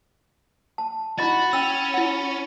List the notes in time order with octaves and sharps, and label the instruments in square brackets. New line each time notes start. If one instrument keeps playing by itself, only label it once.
[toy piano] A5
[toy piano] D#4 E4 D#5 [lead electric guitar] F#4 [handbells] B5 A6
[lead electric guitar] C#4 [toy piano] G5 E6
[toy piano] E4 F#5